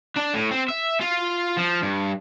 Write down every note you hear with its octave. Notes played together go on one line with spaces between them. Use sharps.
D4
A2
C4
E5
F4
F3
G2